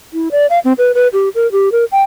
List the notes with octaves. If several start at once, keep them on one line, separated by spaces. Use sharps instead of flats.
E4
D5
F5
C4
B4
B4
G4
A#4
G4
A#4
G5